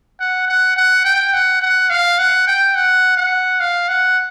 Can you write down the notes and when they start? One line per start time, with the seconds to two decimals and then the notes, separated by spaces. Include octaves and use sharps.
0.20 F#5
0.48 F#5
0.77 F#5
1.05 G5
1.33 F#5
1.62 F#5
1.90 F5
2.19 F#5
2.48 G5
2.75 F#5
3.17 F#5
3.60 F5
3.89 F#5